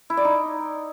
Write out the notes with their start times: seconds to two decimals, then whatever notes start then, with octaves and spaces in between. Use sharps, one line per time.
0.10 E4
0.17 D5
0.25 D#4